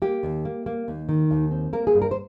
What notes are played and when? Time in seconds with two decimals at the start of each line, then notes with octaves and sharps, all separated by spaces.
0.02 A#3 G4
0.23 D#2
0.45 A#3
0.66 A#3
0.88 D#2
1.09 D#3
1.31 D#2
1.51 C4
1.73 A#3 A#4
1.87 G#4
1.94 G2
2.02 A#4
2.11 C5